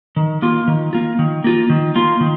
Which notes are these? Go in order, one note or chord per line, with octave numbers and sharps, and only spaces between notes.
D#3
A#3 F4
D#3
A#3 F4
D#3
A#3 F4
D#3
A#3 F4
D#3